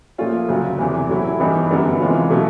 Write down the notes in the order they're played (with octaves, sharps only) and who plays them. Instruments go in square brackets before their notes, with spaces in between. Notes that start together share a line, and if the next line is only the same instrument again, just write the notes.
[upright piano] A#2 F3 A3 C#4 F4
D2 C#3 F#3
E2 C3 E3
A2 F#3 A3 C#4 E4
G2 E3 G3 B3 D#4
F#2 D3 G3 B3
C3 E3 G#3 C#4 F4
B2 F#3 A3